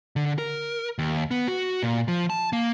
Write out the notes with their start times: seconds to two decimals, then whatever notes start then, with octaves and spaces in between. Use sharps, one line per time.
0.16 D3
0.38 A#4
0.99 D#2
1.31 B3
1.48 F#4
1.83 A#2
2.08 F3
2.30 A5
2.53 A#3